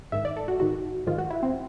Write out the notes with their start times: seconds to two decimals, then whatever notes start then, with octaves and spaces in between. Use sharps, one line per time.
0.12 G#2 D#3 E5
0.25 D5
0.37 A4
0.48 F#4
0.60 G#2 D#3 F#4
1.07 G#2 D#3 F4
1.18 F#4
1.30 E4
1.43 C4